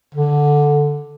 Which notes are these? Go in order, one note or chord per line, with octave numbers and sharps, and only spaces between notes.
D3